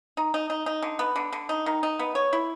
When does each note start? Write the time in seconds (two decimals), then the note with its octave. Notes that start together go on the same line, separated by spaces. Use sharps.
0.17 D#4
0.34 D#4
0.50 D#4
0.66 D#4
0.82 D3
0.99 B3
1.16 D3
1.32 D3
1.49 D#4
1.66 D#3
1.83 D#4
1.99 B3
2.15 C#5
2.33 E4